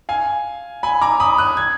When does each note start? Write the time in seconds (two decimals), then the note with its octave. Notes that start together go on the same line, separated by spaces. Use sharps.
0.09 F5 G#5
0.83 G#5 B5
1.01 A#5 D6
1.20 B5 D#6
1.38 D#6 F#6
1.57 G#6